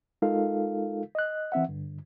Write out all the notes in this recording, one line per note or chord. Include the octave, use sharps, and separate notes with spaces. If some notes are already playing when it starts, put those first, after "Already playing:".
G#3 D#4 F4 A4 A#4 F5
D#5 F#6
E3 C4 E5 F#5
G2 D3